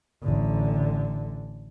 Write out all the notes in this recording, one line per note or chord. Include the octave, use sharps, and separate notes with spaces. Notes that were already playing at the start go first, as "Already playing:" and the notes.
A1 D3